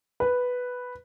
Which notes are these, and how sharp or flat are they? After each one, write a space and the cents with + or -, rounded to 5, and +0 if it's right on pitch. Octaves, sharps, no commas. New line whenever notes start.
B4 +0